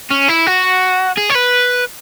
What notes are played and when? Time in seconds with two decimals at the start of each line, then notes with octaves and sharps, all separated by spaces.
0.10 C#4
0.28 E4
0.46 F#4
1.18 G#4
1.30 C#5
1.35 B4